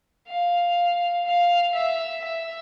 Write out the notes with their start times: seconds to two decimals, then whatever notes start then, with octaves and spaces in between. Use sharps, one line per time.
0.28 F5
1.26 F5
1.74 E5
2.24 E5